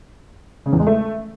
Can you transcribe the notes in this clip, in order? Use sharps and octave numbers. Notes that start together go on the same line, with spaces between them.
C#3
E2
G#3
A3